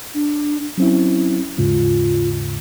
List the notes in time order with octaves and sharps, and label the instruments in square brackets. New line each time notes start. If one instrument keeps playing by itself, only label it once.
[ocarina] D4
[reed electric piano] F#3 C4 E4 [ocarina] C#4
[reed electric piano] D#2 G#2 C#3 [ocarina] F4